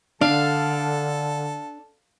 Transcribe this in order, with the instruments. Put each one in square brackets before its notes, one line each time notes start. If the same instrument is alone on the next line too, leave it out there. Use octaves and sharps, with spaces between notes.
[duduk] D3 [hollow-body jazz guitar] D4 [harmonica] A4 [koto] F5